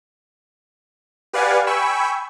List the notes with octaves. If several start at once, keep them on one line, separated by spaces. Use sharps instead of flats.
G4 B4 D5 F5 F#5 G#5
G5 G#5 B5 C#6 E6